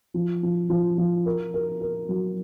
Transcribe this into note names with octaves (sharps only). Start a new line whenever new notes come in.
F3
F3
F3
F3
A#4
A#4
A#4
F#3